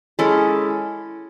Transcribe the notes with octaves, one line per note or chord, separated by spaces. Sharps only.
G#3 C#4 E4 A4